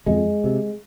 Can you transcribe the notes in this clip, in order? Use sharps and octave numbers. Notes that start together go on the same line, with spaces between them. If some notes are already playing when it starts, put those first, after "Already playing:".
F2 G#3
C3